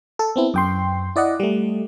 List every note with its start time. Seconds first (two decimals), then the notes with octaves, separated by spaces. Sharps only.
0.19 A4
0.36 B3 C4 E4
0.54 F#2 G5 C6
1.16 E4 D5 D#5 F#5
1.40 G3 A3